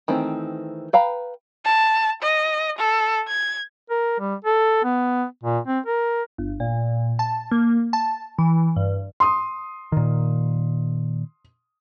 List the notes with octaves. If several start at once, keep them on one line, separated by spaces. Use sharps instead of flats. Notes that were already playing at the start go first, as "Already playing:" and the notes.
D#3 E3 A3 C4
B4 F5 G5 A#5 B5
A5
D#5
A4
G#6
A#4
G3
A4
B3
A#2
C4
A#4
G1
A#2
A5
A#3
A5
E3
G2
C6 D#6
A#2 D#3